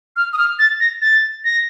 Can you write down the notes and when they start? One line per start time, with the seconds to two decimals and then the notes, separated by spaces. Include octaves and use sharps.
0.16 F6
0.33 D#6
0.38 F6
0.59 A6
0.80 A#6
1.02 A6
1.44 A#6